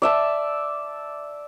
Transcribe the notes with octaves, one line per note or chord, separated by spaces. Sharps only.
D5 E5 A5